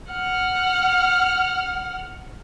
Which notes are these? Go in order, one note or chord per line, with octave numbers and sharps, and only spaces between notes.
F#5 F6